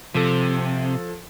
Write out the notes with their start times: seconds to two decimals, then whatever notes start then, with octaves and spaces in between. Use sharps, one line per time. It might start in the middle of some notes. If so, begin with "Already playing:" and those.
0.14 C3 F3 A4